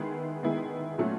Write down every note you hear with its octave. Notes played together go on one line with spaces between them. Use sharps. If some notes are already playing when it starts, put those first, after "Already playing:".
Already playing: D#3 G#3 B3 E4 G#4
D#3 G#3 B3 E4 G#4
A#2 F#3 A3 C#4 F#4